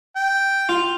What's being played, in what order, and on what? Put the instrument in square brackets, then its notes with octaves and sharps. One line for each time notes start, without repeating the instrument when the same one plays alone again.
[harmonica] G5
[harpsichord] F4